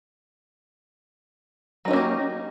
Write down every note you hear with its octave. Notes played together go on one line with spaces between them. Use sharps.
F#3 A#3 C#4 D#4 G4